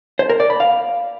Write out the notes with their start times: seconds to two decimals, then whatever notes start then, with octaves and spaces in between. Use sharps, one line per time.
0.19 C5
0.29 A#4
0.40 D5
0.50 B5
0.60 F5